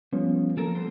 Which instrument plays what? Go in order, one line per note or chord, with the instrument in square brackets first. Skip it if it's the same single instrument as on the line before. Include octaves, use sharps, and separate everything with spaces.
[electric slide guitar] F3 [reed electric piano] G3 B3 C#4
[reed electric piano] F3 [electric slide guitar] A#3 A4 A#4
[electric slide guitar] G3 B3 C5